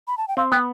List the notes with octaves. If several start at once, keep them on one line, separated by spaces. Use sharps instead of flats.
B5
A5
G5
C4 F5
B3 G5